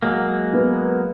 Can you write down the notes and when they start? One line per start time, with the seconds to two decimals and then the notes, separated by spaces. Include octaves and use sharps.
0.02 F#3 G#3 A#3
0.53 B3